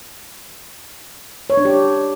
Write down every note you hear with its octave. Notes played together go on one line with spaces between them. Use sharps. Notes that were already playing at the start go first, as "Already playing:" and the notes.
C#5
D4
G4